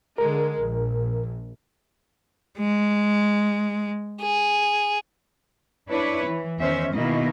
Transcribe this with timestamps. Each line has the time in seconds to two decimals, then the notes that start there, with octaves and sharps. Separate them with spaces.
0.18 D3 G#3 A#4
0.57 A#1
2.58 G#3
4.21 G#4
5.88 D4 E4 B4 C#5
6.26 E3
6.59 E2 D#3 C#4 C5 E5
6.93 B2 D#3 A#3 E4 D#5